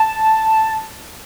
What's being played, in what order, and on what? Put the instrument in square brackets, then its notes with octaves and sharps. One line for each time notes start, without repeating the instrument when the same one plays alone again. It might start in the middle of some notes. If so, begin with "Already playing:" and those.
Already playing: [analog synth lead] A5